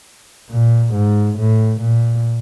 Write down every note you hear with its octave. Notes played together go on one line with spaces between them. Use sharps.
A#2
G#2
A2
A#2